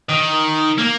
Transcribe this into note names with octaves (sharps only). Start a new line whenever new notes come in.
D#3
A#3